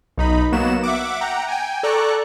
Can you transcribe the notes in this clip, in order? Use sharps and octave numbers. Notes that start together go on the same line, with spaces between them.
B1 D#4 B5
F#3 A#3 B3 F#4 E7
E5 F#5 D6
F#5 G5 A#5
G5 G#5
A4 D5 A#5 C#6 F#6